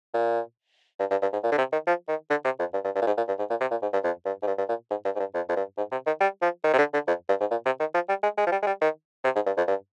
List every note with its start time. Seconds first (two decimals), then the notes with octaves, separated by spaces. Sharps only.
0.14 A#2
1.00 G2
1.11 G2
1.22 G2
1.33 G#2
1.43 A#2
1.52 D3
1.58 C3
1.72 D#3
1.87 F3
2.08 D#3
2.30 D3
2.45 C3
2.59 F2
2.73 G2
2.85 G2
2.95 G2
3.02 A#2
3.07 G#2
3.17 A#2
3.28 G2
3.39 G#2
3.50 A#2
3.61 C3
3.71 A#2
3.82 G#2
3.93 G2
4.04 F2
4.25 G2
4.42 G#2
4.47 G2
4.58 G2
4.69 A#2
4.90 G#2
5.05 G2
5.15 G#2
5.19 G2
5.34 F2
5.49 F2
5.56 G2
5.77 G#2
5.92 C3
6.06 D#3
6.20 G3
6.42 F3
6.64 D#3
6.73 C3
6.78 D3
6.93 D3
7.08 F2
7.29 G2
7.40 G#2
7.51 A#2
7.65 C3
7.80 D#3
7.94 F3
8.09 G3
8.23 G#3
8.37 G#3
8.47 F3
8.52 G3
8.62 G#3
8.67 G3
8.81 D#3
9.24 C3
9.35 G#2
9.46 G2
9.57 F2
9.68 G2